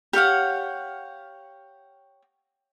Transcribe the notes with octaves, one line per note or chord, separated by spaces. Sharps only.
G4 C#5 F5 F#5